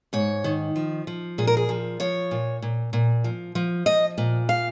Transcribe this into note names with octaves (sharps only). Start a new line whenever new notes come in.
G#2 C#5
D#3
F3
F3
A#2 G#4
A#4
G#4
F3
F3 C#5
A#2
A#2
A#2
F3
F3
F3 D#5
A#2
F5